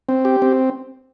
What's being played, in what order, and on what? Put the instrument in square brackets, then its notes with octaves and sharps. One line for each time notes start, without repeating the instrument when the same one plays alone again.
[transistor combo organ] C4
G4
C4